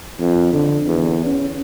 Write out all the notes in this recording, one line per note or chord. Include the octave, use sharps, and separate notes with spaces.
F2
D3
E2
C#4